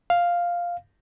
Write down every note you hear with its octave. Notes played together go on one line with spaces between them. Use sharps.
F5